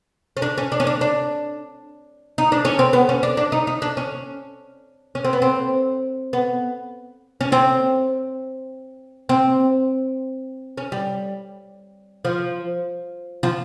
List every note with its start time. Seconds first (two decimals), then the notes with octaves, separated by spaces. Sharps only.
0.37 C#4
0.42 D4
0.58 C#4
0.72 D4
0.80 C#4
0.87 D4
1.01 D4
2.38 D#4
2.52 D4
2.65 C#4
2.79 C4
2.93 B3
3.09 C#4
3.23 D4
3.37 D4
3.52 D#4
3.67 D#4
3.82 D4
3.97 C#4
5.15 C#4
5.25 C4
5.33 B3
5.42 C4
6.33 B3
7.41 C#4
7.52 C4
9.29 C4
10.77 C#4
10.92 G3
12.25 F3
13.43 F3